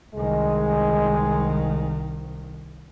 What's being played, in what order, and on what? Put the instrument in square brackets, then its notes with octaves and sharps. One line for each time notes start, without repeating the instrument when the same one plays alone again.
[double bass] C2 D#3 [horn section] G#3